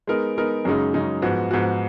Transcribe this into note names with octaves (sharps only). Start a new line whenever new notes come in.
G#3 B3 D#4 A#4
G#3 B3 D#4 A#4
F#2 C#3 G#3 D#4
F#2 C#3 G#3 D#4
G#2 F3 B3 F#4
G#2 F3 B3 F#4